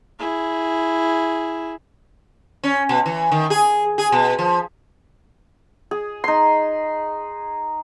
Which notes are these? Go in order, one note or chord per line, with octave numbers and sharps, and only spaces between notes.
E4 G#4
C#4
B2
E3
D#3
G#4
G#4
B2
F3
G#4
D#4 C6